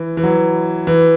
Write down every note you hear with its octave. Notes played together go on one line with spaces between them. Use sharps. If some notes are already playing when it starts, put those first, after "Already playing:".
Already playing: E3
E3
F#3
E3